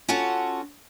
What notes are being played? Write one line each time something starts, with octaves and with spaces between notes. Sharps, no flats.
C#4 F4 F#4 A4 F#5 A5